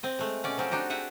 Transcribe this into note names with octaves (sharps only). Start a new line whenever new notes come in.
C4 D#5
G#3 A3
B2 C#4 D5
F3 F#3 C4 C#4
D4 D#4 F#4 G4
G#4 E5 F#5 G#5